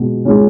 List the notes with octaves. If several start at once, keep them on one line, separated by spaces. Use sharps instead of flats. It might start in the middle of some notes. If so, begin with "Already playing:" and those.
Already playing: B2 G#3
G#3 C#4